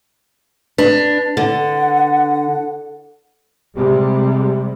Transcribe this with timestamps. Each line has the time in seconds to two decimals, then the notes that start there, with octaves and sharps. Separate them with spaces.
0.78 D4 B4
1.37 D3 F#5
3.76 C3 G3 G#3